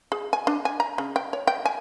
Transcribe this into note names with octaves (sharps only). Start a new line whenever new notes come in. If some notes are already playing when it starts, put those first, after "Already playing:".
G#4
G#5
D4
G#5
A#5
C#3
G5
C#5
G5
G#5